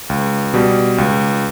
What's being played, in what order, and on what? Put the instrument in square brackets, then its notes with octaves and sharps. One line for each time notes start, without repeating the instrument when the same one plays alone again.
[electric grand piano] C#2
B2 G3
C#2